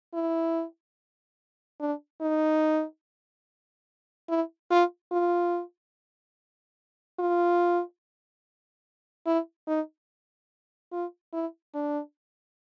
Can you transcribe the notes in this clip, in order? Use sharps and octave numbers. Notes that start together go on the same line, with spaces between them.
E4
D4
D#4
E4
F4
F4
F4
E4
D#4
F4
E4
D4